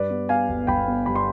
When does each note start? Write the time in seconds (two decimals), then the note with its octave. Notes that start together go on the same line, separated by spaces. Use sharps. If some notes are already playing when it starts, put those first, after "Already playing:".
Already playing: G2 B4 D5
0.10 B3
0.29 B3 F5 G#5
0.49 G1
0.67 G1 G5 B5
0.88 B3
1.06 G2 B5
1.15 C6